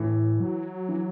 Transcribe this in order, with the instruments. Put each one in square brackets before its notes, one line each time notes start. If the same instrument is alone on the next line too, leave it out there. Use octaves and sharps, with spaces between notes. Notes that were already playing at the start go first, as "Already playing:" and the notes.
Already playing: [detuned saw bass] A2 [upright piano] E3
[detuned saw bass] F#3
[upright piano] E3